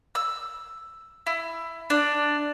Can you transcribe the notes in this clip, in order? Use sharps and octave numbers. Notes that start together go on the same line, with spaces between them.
E6
E4
D4